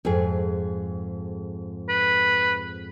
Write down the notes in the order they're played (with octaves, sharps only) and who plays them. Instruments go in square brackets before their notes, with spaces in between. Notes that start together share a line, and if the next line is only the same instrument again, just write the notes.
[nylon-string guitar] F2 G#2 G#4
[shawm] B4